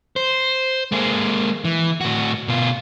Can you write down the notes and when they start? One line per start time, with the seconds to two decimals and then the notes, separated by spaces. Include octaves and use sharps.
0.16 C5
0.92 G#3 A#3
1.65 E3
2.01 A2 F#4
2.48 B2 F4